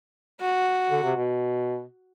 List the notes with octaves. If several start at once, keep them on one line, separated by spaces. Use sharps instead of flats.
F#4
D3
C3
B2